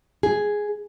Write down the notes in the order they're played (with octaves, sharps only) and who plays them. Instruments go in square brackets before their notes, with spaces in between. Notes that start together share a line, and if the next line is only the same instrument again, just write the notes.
[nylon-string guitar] G#4